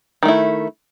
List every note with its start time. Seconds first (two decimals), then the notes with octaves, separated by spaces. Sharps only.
0.23 D#3
0.25 A3
0.28 E4